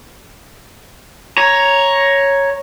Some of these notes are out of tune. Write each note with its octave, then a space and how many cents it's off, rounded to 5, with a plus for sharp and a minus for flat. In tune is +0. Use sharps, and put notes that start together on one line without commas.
C#5 +0 A#5 +10